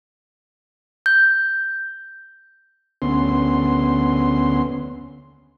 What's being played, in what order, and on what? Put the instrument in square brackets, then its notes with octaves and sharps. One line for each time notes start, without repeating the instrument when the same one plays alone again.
[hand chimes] G6
[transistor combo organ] D2 B3 C#4 C6